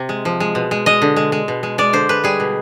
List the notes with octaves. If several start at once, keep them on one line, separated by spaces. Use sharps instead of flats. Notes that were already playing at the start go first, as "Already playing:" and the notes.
Already playing: C3
G#3
F3
G#3
B2
G#3
G#3 D#5
D3
G#3
G#3
B2
G#3
G#3 D5
D3 C5
G#3 B4
G3 G#4
B2